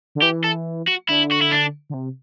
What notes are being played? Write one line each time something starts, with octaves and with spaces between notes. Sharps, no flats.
D3
E3 G4
A4
F#4
D3 E4
F#4
E4
D4
D3
C3